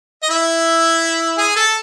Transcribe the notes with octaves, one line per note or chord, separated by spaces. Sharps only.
D#5
E4 E5
G#4 G#5
A4 A5